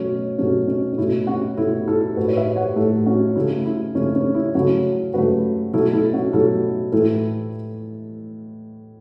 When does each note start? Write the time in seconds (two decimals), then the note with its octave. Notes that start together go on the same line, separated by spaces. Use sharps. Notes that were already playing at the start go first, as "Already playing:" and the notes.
Already playing: B2 F#3 A3 C#4
0.38 B2 F#3 A3 C#4
0.68 C#4
0.93 C#4
0.98 B2 A3 E4
1.27 C#4 F#4
1.57 B2 A3 E4 A4
1.87 E4 A4
2.17 A2 A3 F#4 B4
2.28 C#5
2.37 B4 E5
2.56 C#5 F#5
2.76 A2 A3 E4 A4
3.06 C#4 F#4
3.36 C#3 E3 A3 E4
3.66 E4
3.95 C#3 E3 A3 C#4
4.15 C#4
4.35 E4
4.55 C#3 F#3 A3 C#4 F#4
5.14 C#3 F#3 A3 F#4 B4
5.73 B2 F#3 A3 E4 A4
5.93 E4 A4
6.13 C#4 F#4
6.33 B2 F#3 A3 E4 A4
6.92 A2 E3 A3 E4 A4